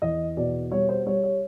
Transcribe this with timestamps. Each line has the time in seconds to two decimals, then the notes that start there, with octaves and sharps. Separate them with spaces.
0.02 E2 D#5
0.37 B2 D5
0.72 G3 C#5
0.89 C5
1.06 G3 C#5
1.24 C#5